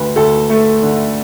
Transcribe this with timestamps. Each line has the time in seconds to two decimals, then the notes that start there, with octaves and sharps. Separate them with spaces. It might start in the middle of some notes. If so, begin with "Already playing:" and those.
Already playing: D2 D3 B4
0.16 D2 A4
0.50 A3
0.83 D3